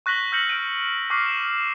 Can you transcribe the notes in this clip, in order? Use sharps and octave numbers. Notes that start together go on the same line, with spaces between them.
C#6 F#6 A#6 B6 F#7 G7
E6 F6 G6 A#6 C#7 F#7
F6 F#6 D7 D#7
C#6 D6 F6 F#6 B6 C7
E7